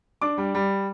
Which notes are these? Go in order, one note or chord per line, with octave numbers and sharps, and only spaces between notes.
D4 D6
G3
G3